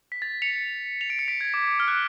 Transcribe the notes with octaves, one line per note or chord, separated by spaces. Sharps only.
B6
A6
C#7 F7
F7
D7
C#7
B6 D7
G#6
D6
D6
F6
F#6